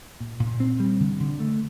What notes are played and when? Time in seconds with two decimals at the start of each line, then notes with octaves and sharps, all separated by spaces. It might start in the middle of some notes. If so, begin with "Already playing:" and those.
0.20 A#2
0.40 A#2
0.60 C4
0.80 G3
1.00 D3
1.20 D3
1.40 A3